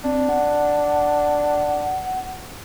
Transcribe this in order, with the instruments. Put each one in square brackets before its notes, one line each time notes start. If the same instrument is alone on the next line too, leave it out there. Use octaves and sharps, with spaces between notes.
[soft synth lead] C4 [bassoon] D4
[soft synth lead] F#5